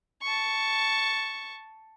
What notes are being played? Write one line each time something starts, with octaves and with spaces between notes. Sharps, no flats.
A5 C#6